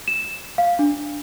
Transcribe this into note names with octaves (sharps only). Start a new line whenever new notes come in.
E7
F5
D4